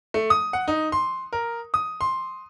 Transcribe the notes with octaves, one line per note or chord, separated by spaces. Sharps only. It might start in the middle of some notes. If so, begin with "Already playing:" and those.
A3
D#6
F#5
D#4
C6
A#4
D#6
C6